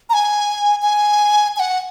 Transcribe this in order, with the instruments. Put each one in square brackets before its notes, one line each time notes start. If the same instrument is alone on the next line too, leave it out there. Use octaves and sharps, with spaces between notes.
[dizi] A#5
G#5
G#5
G#5
F#5